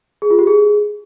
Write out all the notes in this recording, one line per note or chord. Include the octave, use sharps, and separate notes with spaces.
G#4
F4
G4
G#4